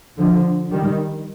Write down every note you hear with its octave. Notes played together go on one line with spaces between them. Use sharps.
D3 F3
D#3 G3